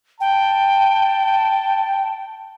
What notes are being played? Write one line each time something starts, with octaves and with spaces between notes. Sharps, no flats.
G5 A5